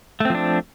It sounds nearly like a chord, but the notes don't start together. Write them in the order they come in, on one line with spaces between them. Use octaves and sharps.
A3 C4 F3 D4